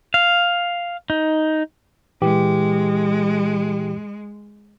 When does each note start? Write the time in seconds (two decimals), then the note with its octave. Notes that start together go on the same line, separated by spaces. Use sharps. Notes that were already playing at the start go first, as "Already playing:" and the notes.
0.14 F5
1.10 D#4
2.22 A#2 E3 G#3 G4